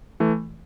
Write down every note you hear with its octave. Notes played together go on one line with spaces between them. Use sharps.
E3 A3